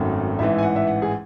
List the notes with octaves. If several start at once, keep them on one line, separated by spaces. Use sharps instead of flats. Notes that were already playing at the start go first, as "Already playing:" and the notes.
Already playing: G#1 F#2 D#3 A3
A1 G#2 E3 E5
G#5
F#5
E5
F#5
G#4